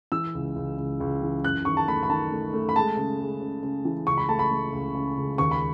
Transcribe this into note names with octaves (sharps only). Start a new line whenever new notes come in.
E3 E6
C#2
C#2
C#2
C#2
E3
F#2 F#6
D#3 C#6
A5
A3 B5
B5
D#3 A5
A3
A3
B5
G#3 A5
C#3
G#3
C#3
C#3
E3
C#2 C#6
B5
A3 A5
B5
A3
C#2
C#3
C#2
D#2 C#6
B5